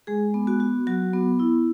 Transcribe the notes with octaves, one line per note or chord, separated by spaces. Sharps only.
G#3 G#4
B3
F#4
F#4
F#3 F#4
B3
E4